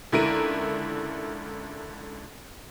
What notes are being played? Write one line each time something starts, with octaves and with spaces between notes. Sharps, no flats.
C#2 D3 E4 A#4 D7 D#7